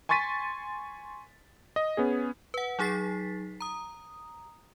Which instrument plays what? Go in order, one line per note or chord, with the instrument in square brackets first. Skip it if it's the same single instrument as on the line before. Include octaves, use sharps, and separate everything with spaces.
[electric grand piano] G#5 C6 C#6 A6 B6 D#7
D#5
B3 C#4 G#4
[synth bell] B4 F#5
F#3 D#4 G#4 A6 B6 C7
A#5 D#6